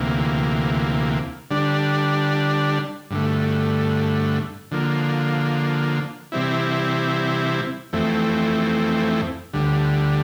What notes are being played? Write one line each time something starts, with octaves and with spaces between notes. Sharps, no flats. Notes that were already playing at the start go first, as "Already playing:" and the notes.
Already playing: D2 C3 E3 A#3
D3 G3 D4
G2 D3 A3
D3 F3 A#3
C3 E3 G3 C4 E4
F2 E3 A3 C4
D2 D3 G3